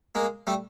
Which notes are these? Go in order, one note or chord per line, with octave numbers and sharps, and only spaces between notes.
G#3 A#3
G3 A3